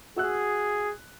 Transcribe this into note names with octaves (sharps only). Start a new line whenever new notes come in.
F#4 G#4 E6 F#6